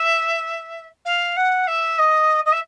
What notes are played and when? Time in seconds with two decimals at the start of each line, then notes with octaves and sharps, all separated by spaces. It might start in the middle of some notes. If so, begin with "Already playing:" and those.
Already playing: E5
1.05 F5
1.37 F#5
1.67 E5
1.99 D#5
2.46 D#5
2.53 E5